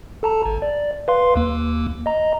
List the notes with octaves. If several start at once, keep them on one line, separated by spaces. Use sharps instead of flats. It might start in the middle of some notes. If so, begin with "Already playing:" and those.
A4 A5 A#5
G#1
D5
B4 F5 C6
D#2 A#3
D#5 A#5